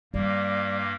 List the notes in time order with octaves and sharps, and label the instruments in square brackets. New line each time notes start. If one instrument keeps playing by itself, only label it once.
[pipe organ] G2 A#3 [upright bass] G3 [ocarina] D5